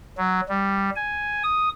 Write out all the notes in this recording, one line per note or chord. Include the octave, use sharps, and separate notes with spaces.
F#3
G3
G#5
D#6